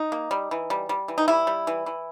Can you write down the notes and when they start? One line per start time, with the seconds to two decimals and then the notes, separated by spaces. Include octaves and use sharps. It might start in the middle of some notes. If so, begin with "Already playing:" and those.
Already playing: D#4
0.12 A#3
0.31 G3
0.51 E3
0.70 G3
0.89 G3
1.08 E3
1.18 D#4
1.28 G3 E4
1.47 G3
1.67 E3
1.86 E3